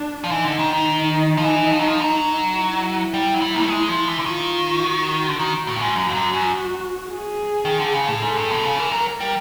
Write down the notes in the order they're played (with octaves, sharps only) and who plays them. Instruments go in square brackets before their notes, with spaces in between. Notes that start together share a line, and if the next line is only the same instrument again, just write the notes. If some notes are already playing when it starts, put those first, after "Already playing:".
Already playing: [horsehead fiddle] D4
[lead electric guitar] F3
[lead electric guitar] E3 [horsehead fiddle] D#4
[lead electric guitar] D3
D#3
D#3
F3
E3
F3
F#3
F3
F#3
[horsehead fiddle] E4
[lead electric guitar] G3
F#3
G3
A#3
A3
G#3
F3
E3
D3
[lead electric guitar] D#3 [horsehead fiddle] F4
[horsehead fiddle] F#4
[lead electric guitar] D3
D#3
A2
G2
G#2
[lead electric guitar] F#2 [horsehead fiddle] F#4
[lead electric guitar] F2
F#2
F#2
[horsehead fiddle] G#4
[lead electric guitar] D#3
D3
C#3
A2
[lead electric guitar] G#2 [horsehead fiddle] A4
[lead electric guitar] G2
B2
C#3
[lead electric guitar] E3 [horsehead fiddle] A#4
[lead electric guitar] F#3
G3